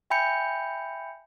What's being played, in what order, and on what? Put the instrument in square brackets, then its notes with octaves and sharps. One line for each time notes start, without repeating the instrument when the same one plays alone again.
[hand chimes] E5 G5 G#5 B5 G6 C#7